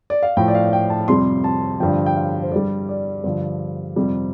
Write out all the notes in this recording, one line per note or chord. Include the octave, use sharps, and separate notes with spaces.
D5
F5
A2 F3 G5
D5
F5
G5
A5
F2 C3 G3 C6
A5
G2 D3 F3 G5
G5
F5
C5
G2 G3 D5
D5
G2 D3 F3
F2 C3 G3